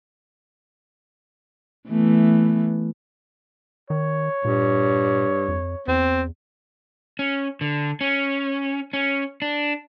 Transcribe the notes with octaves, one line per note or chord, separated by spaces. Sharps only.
E3 A3 B3
D#3 C#5
G2 A#2
F2
E2 C4
C#4
D3
C#4
C#4
D4